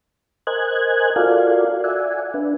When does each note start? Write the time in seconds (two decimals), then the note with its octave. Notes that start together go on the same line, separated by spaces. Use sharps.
0.47 A#4 C5 D#5 G#5 F#6 G#6
1.16 F4 F#4 A4 A#4 D5 F5
1.84 D5 E5 F#5 G#5
2.34 D4 B4